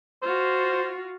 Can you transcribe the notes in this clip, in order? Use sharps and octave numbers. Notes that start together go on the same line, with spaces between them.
F4 F#4 C5